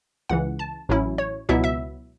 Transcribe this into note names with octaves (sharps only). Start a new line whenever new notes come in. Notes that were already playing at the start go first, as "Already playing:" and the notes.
C#2 C#3 E3 F#5
A5
A1 A2 F#3 C#4 E4
C#5
C#2 B2 F#3 B3 E4 E5
E5